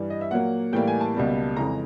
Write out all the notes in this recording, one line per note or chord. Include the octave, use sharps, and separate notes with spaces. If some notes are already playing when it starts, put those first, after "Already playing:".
Already playing: G2 E3 G3
D#5
E5
A#2 F#3 A#3 F#5
A2 E3 G3 A#3 G5
G#5
A5
C#2 B2 G3 A#3
F2 C#3 E3 G#3 A#5